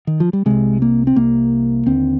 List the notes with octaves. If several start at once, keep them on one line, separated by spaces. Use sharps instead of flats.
D#3
F3
G3
C2 C3 G#3
A#3
C4
C2 C3 A#3
D#2 D3 C4